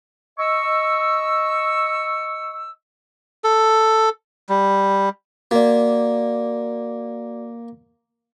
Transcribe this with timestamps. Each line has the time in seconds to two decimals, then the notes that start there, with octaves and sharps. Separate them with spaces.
0.39 D#5 C#6 E6
3.44 A4
4.49 G3
5.51 A#3 F#4 D5